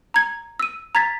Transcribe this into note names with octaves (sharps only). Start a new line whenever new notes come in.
A#5 G#6
E6 D#7
A#5 G#6 A6 B6